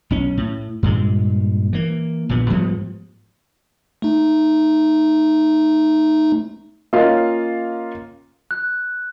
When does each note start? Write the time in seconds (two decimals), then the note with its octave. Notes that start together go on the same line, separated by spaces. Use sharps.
0.10 B1 C#4
0.37 A2
0.83 G2 A#2 G#3
1.73 E3 A#3
2.29 A#1 A#2 B3
2.50 G#2 F3 G3 B3
4.02 A3 D#4
6.93 A#3 C#4 F4 C#5 D#5 F5
8.51 F#6